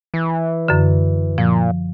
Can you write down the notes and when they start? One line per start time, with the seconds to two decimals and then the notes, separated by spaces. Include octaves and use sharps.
0.14 E3
0.68 F#2 D3
1.38 A#2 F3